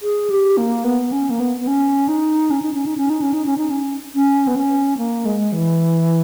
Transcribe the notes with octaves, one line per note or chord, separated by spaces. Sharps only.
G#4
G4
A#3
B3
C#4
A#3
B3
B3
C#4
D#4
C#4
D#4
C#4
D#4
C#4
D#4
C#4
D#4
C#4
D#4
C#4
C#4
B3
C#4
A#3
G#3
E3